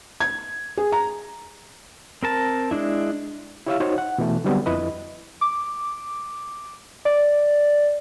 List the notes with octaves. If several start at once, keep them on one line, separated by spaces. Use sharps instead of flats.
G#6
G#4
A#5
C4 A#4 A5
G#3 D4 E4
E4 G4 C#5 E5 F5 E6
D#4 F#4 C5 C#5
F#5
B2 E3 A3
D3 F#3 G3 B3 C4
F2 E4 B4 D#5
D6
D5